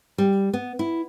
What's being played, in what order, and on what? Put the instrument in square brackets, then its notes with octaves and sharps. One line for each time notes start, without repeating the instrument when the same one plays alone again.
[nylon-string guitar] G3
B3
E4